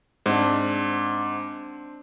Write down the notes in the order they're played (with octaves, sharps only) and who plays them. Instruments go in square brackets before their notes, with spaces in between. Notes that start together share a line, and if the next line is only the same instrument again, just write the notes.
[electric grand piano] G#2 [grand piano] C4 D4